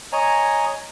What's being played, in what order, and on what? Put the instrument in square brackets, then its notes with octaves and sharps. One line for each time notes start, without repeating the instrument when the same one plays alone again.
[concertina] C#5 D#5 G#5 A#5